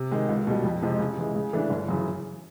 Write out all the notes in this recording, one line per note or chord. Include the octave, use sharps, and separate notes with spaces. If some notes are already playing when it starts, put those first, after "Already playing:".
Already playing: C3
D#3 G#3
C#2
B2 G3
F2
C3 F3 G#3
C#3
E3 G#3
C#3
E3 A3 D4
G1
F#2 C#3 E3